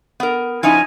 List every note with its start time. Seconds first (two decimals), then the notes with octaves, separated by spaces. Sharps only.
0.20 B3 A#4
0.63 F3 C#4 D#4 E4 G#5